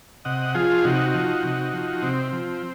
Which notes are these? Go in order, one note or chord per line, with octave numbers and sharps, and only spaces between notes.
C3 D#5 F#5
F3 F4 G#4
C3 D#4 F#4
F3
C3
F3
C3 C4
F3